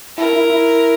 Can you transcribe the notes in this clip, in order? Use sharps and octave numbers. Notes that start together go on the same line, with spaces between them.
E4 A#4
E4
E4